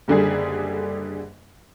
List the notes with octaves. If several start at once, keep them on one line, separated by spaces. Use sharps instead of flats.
F#1 D3 G3 G#4